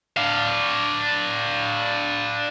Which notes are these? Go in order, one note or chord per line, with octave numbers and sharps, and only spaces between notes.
D4 F5